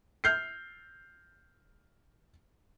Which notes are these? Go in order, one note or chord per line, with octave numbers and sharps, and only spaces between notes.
F6 G6 C7